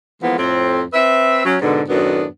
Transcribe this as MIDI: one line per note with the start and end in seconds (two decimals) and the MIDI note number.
0.21 0.36 52
0.21 0.36 53
0.21 0.36 56
0.21 0.36 58
0.21 0.36 59
0.37 0.82 41
0.37 0.82 45
0.37 0.82 60
0.93 1.43 60
0.93 1.43 71
0.93 1.43 76
1.45 1.55 54
1.45 1.55 61
1.61 1.82 44
1.61 1.82 47
1.61 1.82 50
1.88 2.25 42
1.88 2.25 45
1.88 2.25 51
1.88 2.25 59
1.88 2.25 62